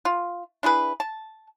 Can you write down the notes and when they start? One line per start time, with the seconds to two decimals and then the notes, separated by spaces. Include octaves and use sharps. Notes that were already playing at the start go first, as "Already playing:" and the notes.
0.05 F4
0.63 D4 E4 G#4 B4
1.00 A5